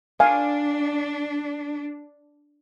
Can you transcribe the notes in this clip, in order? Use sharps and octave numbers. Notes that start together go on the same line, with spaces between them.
D4 F5 G#5